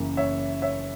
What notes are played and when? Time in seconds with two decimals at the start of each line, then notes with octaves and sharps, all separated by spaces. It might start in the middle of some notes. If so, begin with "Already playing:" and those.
Already playing: F#1 F#2 E3 A#3
0.17 C#5 E5
0.62 C#5 E5